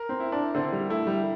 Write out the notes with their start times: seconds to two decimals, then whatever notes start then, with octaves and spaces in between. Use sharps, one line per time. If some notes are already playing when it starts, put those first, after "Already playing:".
Already playing: A#4
0.09 C4
0.20 E4
0.32 D4
0.55 D3 C4
0.72 G3
0.90 A3 E4
1.07 G3